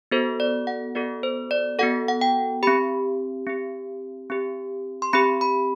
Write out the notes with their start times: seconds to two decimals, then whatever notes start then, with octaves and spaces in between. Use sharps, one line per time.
0.11 B3 F#4 A4 C5
0.40 D5
0.67 F#5
0.95 B3 F#4 A4 D5
1.23 C5
1.51 D5
1.79 B3 F#4 A4 F#5
2.08 F#5
2.21 G5
2.63 C4 G4 B5
3.47 C4 G4
4.30 C4 G4
5.02 C6
5.13 C4 G4 B5
5.41 B5